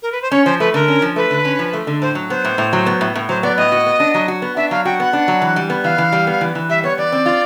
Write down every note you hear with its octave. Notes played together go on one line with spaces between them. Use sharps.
A#4
B4
C5
C#4 C#5
F3 C5
A3 B4
D3 A#4
C#4
F3
A3 B4
D3
C#4
F3
A3
D3
A2 C5
F#3
B3 C5
A2
A2
F#3
B3
A2
A2
F#3 C5
B3 D5
A2 D#5
F#4
B3
D4
F#3
F#4
B3
D4 E5
F#3 F5
F#4 G5
B3 F#5
D4
F#3
E3
G3
B3
E3 F5
E3
G3
B3
E3
E3
G3 E5
B3 C#5
E3 D5
C4
F4